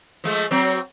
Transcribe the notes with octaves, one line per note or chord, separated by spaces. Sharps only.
F3 G#3 A3
F#3 C4